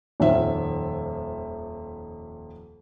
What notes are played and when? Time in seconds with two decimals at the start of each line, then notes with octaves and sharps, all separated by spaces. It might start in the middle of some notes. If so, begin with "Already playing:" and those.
0.20 D#1 F2 D#3 E5